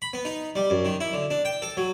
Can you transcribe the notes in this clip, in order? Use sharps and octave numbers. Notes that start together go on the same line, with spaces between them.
B5
B3
D#4
G3
F#2
D#3
E4
D3
D4
G5
A4
F#3